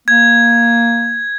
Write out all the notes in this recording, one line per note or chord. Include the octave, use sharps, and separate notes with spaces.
A#3 G#6